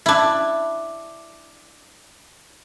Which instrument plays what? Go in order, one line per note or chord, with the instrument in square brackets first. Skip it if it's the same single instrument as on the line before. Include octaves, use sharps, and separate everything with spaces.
[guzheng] D4 E4